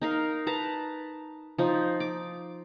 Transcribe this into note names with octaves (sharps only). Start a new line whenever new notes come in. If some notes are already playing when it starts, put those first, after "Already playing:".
D#4 A#4 F5
B4 A5 A#5
F3 D#4
D6